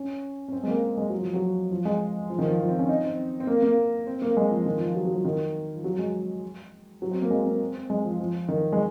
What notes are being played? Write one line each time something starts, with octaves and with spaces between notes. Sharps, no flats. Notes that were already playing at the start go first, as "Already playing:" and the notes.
Already playing: C#4
C#4
C4
G#3
A#3
G#3
F#3
F3
F#3
F3
G#3
F3
D#3
F3
F3
C4
C#4
D#4
C4
C4
A#3
A#3
C4
A#3
G#3
F3
D#3
F3
F#3
F#3
F3
D#3
F3
F#3
G#3
F#3
C4
A#3
G#3
A#3
C4
C4
G#3
F3
F3
D#3
G#3